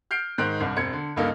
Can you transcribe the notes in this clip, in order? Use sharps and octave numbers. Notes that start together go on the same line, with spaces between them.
F6 G6 C7 D7
G#2 D#3 C5 F#6 D7
C2 G2
E1 C4 G#6 C#7
D3
C#2 G2 A#3 D#4 A4